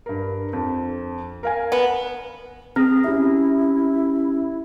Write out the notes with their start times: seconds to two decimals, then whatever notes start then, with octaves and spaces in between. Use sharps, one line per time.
0.06 G2 A#4
0.53 F2
1.43 A#4 F5 G#5
1.72 B3
2.76 C4 G#4 F6 A#6
3.04 C#4 E4 G4 E5